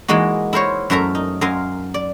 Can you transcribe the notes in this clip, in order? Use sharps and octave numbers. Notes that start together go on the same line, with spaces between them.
E3 G#3 A#3 D#4 F#4
E4 A#4 C5 C#5
F#2 A3 A#4 E5 A#5
D#4
F#2 A#4 F5 G#5 C6
D5